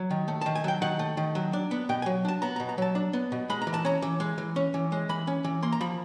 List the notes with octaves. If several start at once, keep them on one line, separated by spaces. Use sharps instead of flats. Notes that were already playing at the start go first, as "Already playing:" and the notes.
Already playing: F#3
D#3
A3
D#3 A5
G#5
F#3 G5
D#3 F#5
A3
D#3
F#3
D4
B3
B2 G5
G#5
F#3
D4 A5
B3 A#5
A#5
B2
A#5
F#3 A5
D4
B3
B2
G#3 B5
A#5
E3
A5
C#4 A#5
E3
G#3
E3
C#4
E3
G#3
E3 B5
C#4
E3
A#3 C6
A#5
F3 B5